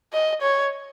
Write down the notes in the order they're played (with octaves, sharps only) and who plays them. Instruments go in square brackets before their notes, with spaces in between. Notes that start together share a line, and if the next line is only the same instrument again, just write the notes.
[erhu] D#5
C#5